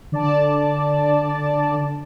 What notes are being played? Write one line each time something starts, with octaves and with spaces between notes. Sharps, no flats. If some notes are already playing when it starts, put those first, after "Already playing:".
D3 D5 A5